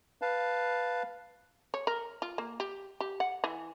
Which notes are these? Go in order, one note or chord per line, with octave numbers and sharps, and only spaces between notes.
B4 F5 A5
C#5
A#4
F4
A#3
G4
G4
F#5
E3